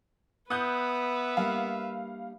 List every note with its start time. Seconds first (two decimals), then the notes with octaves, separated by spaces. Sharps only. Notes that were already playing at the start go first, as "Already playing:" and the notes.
0.50 B3 B4 E5 D#6 F#6 G6
1.37 G3 A#3 D4 F5